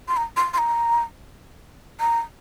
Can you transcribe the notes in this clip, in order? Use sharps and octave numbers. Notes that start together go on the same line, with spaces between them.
C6
A#5
C6
C6
A#5
A#5